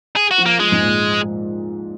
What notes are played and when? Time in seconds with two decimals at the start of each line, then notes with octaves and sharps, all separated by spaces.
0.16 G#4
0.31 F#4
0.38 F3
0.46 A#3
0.59 F3 G#3
0.72 G#2
0.81 A#2